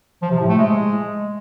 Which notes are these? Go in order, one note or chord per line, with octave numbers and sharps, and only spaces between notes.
F3
C3
A2
A3
G#3